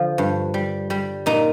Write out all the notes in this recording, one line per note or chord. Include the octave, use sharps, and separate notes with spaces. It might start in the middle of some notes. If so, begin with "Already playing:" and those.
Already playing: D3 F3
G2
G3
G3
A#2 D#4